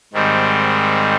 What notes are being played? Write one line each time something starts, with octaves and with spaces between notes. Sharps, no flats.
G#2 D#3 G3 C4